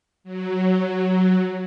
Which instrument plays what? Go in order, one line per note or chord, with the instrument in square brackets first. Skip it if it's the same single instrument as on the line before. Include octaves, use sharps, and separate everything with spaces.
[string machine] F#3